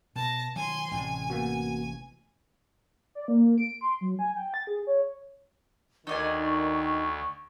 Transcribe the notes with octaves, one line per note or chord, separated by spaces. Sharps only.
B2 A5 A#6
D#3 F#3 G#5 C6
A1 A2 C3 G#5
A#3 B3 F#4
D5
A#3
D7
C6
F#3
G#5
G5
A6
G#4
C#5
D2 D#3 D#4 D5 G#5 C#6